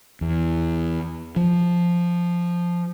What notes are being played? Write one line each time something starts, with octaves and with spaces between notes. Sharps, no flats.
E2
F3